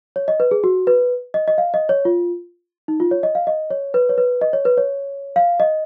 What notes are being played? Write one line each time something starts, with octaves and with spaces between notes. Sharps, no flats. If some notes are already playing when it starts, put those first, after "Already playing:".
C#5
D#5
B4
G#4
F#4
B4
D#5
D#5
F5
D#5
C#5
F4
D#4
F4
C#5
D#5
F5
D#5
C#5
B4
C#5
B4
D#5
C#5
B4
C#5
F5
D#5